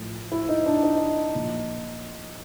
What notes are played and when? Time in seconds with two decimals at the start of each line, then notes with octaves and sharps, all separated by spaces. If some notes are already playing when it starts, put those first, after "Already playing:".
Already playing: A2 F3
0.32 E4
0.49 D#4
0.66 D4
0.83 D#4
1.35 A#2 F3